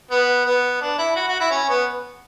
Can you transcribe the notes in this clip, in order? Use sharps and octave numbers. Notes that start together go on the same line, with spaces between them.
B3
B3
D4
E4
F#4
F#4
E4
C#4
B3